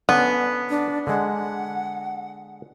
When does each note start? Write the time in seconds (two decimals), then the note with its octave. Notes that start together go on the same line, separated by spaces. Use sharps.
0.09 D3 B3 C#4
0.70 D4
1.07 D3 G#3 F#5